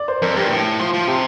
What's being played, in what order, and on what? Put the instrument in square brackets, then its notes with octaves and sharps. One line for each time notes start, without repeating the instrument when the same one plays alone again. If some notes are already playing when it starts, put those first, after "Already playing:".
Already playing: [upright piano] D5
C5
[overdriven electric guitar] F2 [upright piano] A#4
[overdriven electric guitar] G2 [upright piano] G4
[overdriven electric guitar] A#2
A2
F3
F3
[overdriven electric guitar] C3 [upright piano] G4